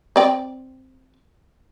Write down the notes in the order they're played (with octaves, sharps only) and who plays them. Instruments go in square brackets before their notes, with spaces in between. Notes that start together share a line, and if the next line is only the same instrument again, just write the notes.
[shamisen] C4 D5 G5